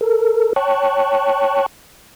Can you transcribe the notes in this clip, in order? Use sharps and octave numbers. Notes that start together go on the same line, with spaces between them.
A4 A#4
C#5 G5 A5 C#6 F#6